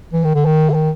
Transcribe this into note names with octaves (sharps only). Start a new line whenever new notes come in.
E3
D#3
D3
D#3
D3
D#3